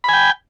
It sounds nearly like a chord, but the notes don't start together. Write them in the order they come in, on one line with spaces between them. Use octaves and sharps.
B5 G#5 G5